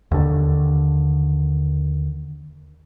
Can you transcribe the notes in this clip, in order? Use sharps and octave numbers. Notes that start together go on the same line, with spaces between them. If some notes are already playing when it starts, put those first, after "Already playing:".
D#2 D3